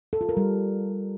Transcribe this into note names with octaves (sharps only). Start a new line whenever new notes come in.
A4
F4
A#4
G3